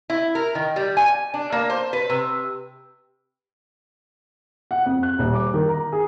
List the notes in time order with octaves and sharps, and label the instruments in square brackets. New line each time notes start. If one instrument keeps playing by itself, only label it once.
[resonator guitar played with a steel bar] E4
A#4
D#3
G3
G#5
D4
A#3
C5
B4
C3
[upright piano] F#5
F2
F#6
D#1
D6
D#3
A#5
G#4